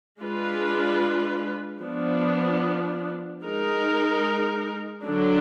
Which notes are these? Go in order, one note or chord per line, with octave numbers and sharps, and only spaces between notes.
G#3 D4 F4 B4
F3 B3 D4
G#3 D#4 A#4
D3 F#3 D4